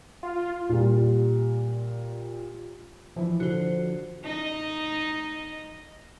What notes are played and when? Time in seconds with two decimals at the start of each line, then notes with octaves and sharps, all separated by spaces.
0.23 F4
0.69 A#2 G3
3.16 E3 F3 E4
3.40 D3 F#4 C5
4.23 D#4 D#5